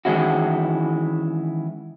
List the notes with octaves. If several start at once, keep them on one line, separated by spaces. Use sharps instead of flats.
D#3 E3 G#3 C#4 E4 F#4